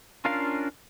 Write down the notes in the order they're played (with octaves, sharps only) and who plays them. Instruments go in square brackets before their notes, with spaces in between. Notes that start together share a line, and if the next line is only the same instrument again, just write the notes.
[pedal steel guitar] C#4 D4 F4 A#4 F5